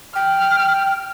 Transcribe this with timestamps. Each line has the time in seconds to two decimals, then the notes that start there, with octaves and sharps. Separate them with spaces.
0.15 G5 F6